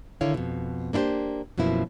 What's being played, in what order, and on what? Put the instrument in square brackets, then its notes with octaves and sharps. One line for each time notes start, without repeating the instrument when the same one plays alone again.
[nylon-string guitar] D3 D#3 E4 C#5 F5
F2 B2
A#3 D4 E4 G4 C5
F#2 B2 F3 A#3 E4